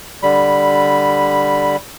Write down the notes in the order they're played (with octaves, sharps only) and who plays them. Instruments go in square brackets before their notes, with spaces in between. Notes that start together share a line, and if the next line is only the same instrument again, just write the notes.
[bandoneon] D3 G3 B5